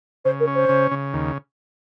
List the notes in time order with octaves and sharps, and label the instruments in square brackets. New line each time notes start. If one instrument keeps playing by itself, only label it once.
[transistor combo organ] C#3 [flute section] C5
[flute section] A#4
[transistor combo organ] C#4
[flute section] C5
[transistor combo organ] C#3
C#3
D#2